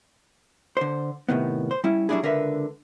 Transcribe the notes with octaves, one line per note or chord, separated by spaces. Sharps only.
D3 C5
A2 C3 D#3 B3
C5
G3 C#4 E4
F#3 G3 A3 D4 E4 G#4
C#2 D3 A#4 B4 E5